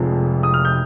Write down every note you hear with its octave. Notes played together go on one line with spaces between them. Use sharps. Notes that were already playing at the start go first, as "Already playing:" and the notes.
Already playing: F1 F2 C3 F3 G#3
D#6
F6
G6